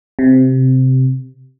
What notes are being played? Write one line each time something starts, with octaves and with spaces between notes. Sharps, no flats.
C3